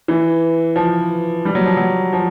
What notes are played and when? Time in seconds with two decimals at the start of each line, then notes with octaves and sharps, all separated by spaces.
0.08 E3
0.76 F3
1.45 G3
1.55 F#3
1.66 F3
1.77 F#3
2.13 F3